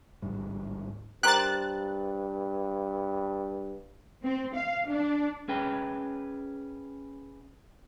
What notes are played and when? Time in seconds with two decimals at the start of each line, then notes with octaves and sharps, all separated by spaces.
0.22 A1 D2 G#2 G3
1.23 G2 G4 A#4 C5 F#6 A6
4.24 C4
4.56 F5
4.89 D4
5.49 C#4 G#4 B4 G5